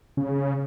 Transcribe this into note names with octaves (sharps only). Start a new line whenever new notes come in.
C#3